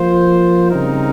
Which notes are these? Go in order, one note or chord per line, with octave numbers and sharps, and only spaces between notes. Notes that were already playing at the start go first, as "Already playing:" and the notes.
Already playing: F3 A#3 F4 C5
C#3 G3 C4 D#4 A#4